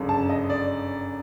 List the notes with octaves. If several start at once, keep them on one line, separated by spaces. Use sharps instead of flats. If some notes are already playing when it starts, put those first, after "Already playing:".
Already playing: G1 F#2 C#3
A5
D#5
D5